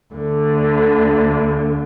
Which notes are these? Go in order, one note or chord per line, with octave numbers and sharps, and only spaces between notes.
D2 D3